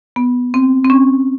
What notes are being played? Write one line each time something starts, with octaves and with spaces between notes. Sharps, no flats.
B3
C4
C4
C#4